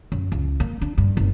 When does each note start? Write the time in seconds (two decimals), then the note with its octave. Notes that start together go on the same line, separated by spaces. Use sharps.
0.12 F#2
0.32 C#2
0.60 A#3
0.81 D4
0.98 G2
1.17 F#1